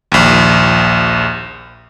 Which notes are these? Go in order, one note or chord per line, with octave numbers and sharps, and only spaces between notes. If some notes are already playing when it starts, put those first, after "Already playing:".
A#1 D#2